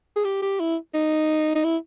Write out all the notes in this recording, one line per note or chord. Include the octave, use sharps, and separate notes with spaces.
G#4
G4
G4
E4
D#4
D#4
E4